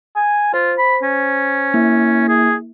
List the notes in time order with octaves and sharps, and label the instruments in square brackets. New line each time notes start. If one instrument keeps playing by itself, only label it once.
[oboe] G#5
[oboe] F4 [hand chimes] C5
[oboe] B5
C#4
[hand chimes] A#3 E4 E5
[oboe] G#4